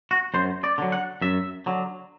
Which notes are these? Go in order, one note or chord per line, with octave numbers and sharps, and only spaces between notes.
F#4
F#2 C5
D5
D3 F#3
F#5
F#2 E5
D3 F#3